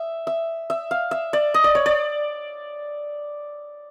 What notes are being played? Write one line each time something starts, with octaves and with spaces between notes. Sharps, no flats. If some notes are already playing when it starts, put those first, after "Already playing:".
Already playing: E5
E5
E5
F5
E5
D5
D#5
D5
C#5
D5